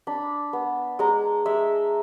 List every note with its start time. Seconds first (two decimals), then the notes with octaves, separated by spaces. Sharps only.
0.07 D4 B5
0.53 B3
0.99 G#3 A#5
1.46 G#3 E5